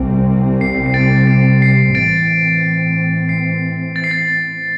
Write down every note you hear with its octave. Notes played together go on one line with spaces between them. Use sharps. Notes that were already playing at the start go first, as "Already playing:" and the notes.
Already playing: C2 C3 G3 C4
C7
C7
A6 D7
C7
C7
A2 E3 C4 A6 D7
C7
A6
C7
A6